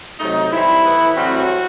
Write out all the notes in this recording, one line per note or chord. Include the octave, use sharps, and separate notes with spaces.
C3 F#3 A3 D#4
E3 G3 C4 E4
A2 E3 B3
A2 E3 F#3 G3 C4 F#4